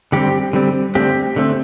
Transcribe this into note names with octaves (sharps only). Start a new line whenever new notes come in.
D3 G3 C4 G4
D3 G3 C4
D3 A3 C4 G4
D3 A3 C4